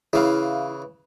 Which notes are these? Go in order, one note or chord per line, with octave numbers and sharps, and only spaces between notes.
C#3 E3 E4 F5